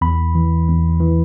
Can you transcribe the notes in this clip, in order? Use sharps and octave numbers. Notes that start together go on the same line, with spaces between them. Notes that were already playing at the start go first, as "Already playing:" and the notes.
E2 B5
E3
E2
E3